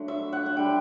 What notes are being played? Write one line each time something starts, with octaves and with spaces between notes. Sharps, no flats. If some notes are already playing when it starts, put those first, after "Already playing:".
Already playing: D3 F#3 A3
E5
F#5
F#5
D3 G3 G5